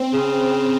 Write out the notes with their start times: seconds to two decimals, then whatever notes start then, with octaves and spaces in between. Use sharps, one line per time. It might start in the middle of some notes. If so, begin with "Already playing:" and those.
Already playing: C4
0.14 C#3